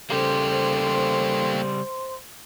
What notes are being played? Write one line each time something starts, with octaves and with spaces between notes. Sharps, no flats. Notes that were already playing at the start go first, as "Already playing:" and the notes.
C#3 G3 A#3 G4 A4 C5 C6